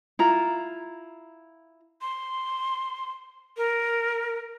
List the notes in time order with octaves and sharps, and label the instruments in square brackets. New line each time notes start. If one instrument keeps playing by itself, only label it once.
[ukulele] E4 F4 A#5
[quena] C6
A#4